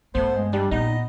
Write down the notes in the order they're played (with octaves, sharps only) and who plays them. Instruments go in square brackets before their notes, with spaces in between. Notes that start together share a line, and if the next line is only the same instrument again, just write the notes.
[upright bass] G2 [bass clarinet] A3 [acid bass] B3 [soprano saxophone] C5
[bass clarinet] G#3
[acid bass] G3 [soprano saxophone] D4 [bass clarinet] G4
[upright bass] A#2 [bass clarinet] B3 [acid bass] D#4 [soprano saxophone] D#5